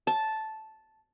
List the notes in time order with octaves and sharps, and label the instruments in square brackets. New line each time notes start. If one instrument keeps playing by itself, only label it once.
[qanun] A5